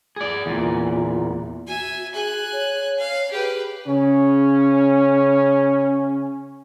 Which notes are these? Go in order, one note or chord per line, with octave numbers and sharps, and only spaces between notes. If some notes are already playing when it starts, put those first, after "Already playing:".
G#4 D5
E2 A#2
F#4 E5 G#5
G#4 G#5 F#6
C#5
F5
G4 G#4 B4
C#3 C#4